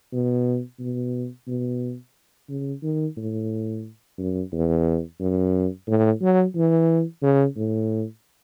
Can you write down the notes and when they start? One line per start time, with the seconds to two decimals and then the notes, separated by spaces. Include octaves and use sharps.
0.12 B2
0.79 B2
1.47 B2
2.49 C#3
2.83 D#3
3.17 A2
4.18 F#2
4.52 E2
5.20 F#2
5.87 A2
6.21 F#3
6.55 E3
7.22 C#3
7.57 A2